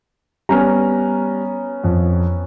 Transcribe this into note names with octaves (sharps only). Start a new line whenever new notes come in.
G3 B3 C#4 A#5 F6
F2